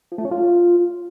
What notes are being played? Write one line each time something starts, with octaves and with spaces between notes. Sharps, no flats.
F3
A3
C#4
F4